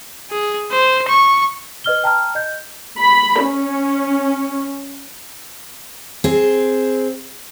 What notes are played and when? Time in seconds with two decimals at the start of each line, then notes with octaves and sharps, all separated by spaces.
0.31 G#4
0.71 C5
1.08 C#6
1.84 B4 D#5 F6 G7
2.04 G5 A5 A#5 F6
2.35 D#5 G6
2.99 B5
3.43 C#4
6.24 C4 G#4